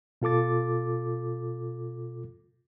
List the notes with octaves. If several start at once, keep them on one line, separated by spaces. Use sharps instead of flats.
B2 F4 A4 D6 A6